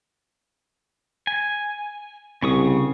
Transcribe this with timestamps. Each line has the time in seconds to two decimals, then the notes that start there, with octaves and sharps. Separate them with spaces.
1.27 G#5
2.42 C2 C#3 C#6 D#6